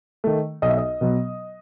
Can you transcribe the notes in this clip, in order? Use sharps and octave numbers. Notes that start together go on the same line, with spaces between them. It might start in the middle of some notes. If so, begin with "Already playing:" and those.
D#3 A3
B1 D#5
E5
D#5
B2 F#3 B3